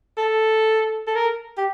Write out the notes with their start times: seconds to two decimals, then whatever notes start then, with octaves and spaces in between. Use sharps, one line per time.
0.18 A4
1.07 A4
1.16 A#4
1.58 G4